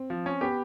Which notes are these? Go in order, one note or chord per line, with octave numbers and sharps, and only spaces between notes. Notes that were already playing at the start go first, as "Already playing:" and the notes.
Already playing: C4
F3
C#4
B3 G4